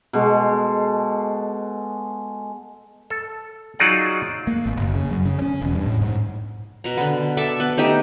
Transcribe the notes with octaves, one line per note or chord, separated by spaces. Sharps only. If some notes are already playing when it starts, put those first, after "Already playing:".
B2 G#3 A4
A4
F#3 D#4 F4 G#4 D5 F#5
A#3
G#1
F#1
C#3
F#2
C#3
C#4
E1
G2
A2
G#2
B2 A#5
D3 B3
A4 D5 E5 A5
B3
A3 D#4 G4 D#5